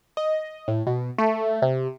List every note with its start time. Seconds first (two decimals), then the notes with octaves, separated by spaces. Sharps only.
0.17 D#5
0.68 A2
0.87 B2
1.18 A3
1.62 C3